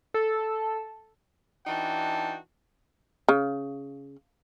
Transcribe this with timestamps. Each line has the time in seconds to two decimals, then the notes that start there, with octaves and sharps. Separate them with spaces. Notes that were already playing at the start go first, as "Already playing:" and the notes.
0.14 A4
1.67 E3 D4 D#4 F#4 G5 A5
3.28 C#3